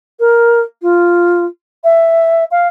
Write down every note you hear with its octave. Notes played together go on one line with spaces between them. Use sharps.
A#4
F4
E5
F5